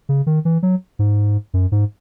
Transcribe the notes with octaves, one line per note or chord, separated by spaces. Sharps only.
C#3
D#3
E3
F#3
G#2
F#2
G#2